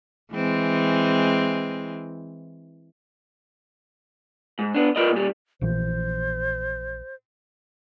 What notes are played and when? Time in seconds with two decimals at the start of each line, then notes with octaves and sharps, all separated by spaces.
0.32 E3 G#3 C4
4.59 G#2
4.75 B3 D4
4.96 F4 A#4 B4 D5 D#5
5.12 A#2 G3
5.61 A#1 A#2 E3 C5